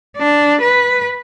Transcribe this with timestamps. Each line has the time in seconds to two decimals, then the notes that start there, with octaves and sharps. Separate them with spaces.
0.17 D4
0.61 B4